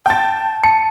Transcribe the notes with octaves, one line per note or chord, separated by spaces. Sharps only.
G5 A5 A6
A5 C#7